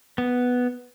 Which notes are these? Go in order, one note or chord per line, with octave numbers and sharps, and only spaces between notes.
B3